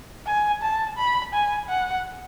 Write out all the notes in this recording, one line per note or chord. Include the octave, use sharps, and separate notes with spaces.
G#5
A5
B5
G#5
F#5